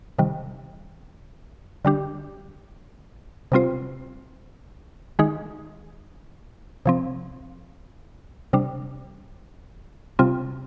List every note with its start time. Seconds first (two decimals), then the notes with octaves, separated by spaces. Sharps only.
0.19 C3 D#3 G3
1.85 D3 G3 D4 G4
3.52 C3 G3 C4 F4 C5
5.19 D#3 G#3 D#4 G#4
6.86 C3 F3 C4
8.53 C3 G3 D4
10.19 C3 G3 C4 F4